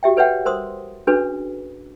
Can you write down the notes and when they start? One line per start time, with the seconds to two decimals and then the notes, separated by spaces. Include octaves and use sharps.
0.03 F#4 G4 E5 G5
0.17 A4 B4 C#5 E5 F#5 G5
0.45 A#4 C5 C6 D#6
1.07 C#4 D4 F#4 G#4 A4 B4